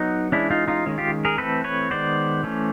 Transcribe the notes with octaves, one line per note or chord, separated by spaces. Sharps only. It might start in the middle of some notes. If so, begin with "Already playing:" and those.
Already playing: F#3 B3 D#4
E3 G#3 C#4 D4 E4
D#4 F4
D#4 F4
D#3 G#3 C#4
F4 G4
G#4 A#4
E3 A3 C4 A4 B4
B4 C#5
D#3 G#3 B3 C5 D5
E3 A3 C#4